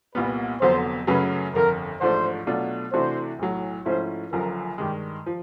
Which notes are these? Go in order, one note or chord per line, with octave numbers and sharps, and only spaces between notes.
C2 A#2 G3 B3 B4
F1 F2 D3 F#3 B3 C5
F#2 C#3 F#3 A3 C#4 B4
G1 F2 D3 A#4
A1 G#2 F3 A3 D4 C5
B2 F#3 A3 D4 F4
C3 E3 A3 D4 F#4 C5
B1 A2 F#3
G#2 F3 A3 C#4 E4 C5
F#1 F#2 D3 F3 A#4
G2 D#3 G#3 G4
F3